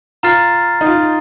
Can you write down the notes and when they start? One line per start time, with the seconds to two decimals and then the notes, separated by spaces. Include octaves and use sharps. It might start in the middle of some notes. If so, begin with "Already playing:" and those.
0.23 F4 A#5 F6 A6 C7
0.81 D#4
0.86 F4